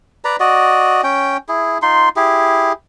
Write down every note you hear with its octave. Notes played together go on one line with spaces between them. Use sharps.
B4 D5 A#5
F#4 D5 D#5
C#4 G5
E4 G#4
D#4 F4 C6
E4 G4 G#4